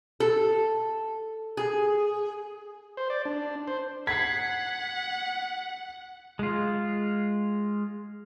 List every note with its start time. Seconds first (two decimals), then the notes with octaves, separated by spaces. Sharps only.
0.20 A4
1.57 G#4
2.97 C5
3.10 D5
3.25 D4
3.68 C5
4.07 F#5 G#6 B6 C7
6.39 G#3 F4